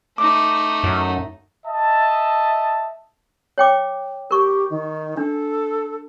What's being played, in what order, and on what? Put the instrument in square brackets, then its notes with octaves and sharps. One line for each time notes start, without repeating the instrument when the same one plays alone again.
[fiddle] A3 D#4 [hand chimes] D6
[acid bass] F#2
[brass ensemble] D#5 E5 A5
[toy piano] C#5 G5 D6
[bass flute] G4 [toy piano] A#4 C#6
[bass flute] D#3
[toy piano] D4 [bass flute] A4